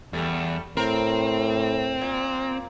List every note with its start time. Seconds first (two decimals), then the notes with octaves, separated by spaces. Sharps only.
0.13 E2 G3 A3
0.77 A2 C4 A#4
2.01 A#2